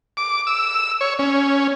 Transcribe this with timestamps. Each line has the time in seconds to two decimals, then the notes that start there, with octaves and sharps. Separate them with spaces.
0.17 D6
0.47 E6
1.01 C#5
1.19 C#4